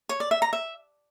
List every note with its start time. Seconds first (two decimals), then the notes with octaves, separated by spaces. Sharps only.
0.09 C#5
0.20 D5
0.31 E5
0.42 A#5
0.53 E5